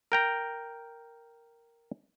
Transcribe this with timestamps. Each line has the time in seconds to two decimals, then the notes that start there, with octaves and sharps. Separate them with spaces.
0.12 A#4 G5 A#5